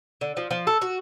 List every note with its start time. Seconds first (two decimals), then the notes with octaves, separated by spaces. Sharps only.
0.21 D3
0.37 F3
0.51 F3
0.67 A4
0.82 F#4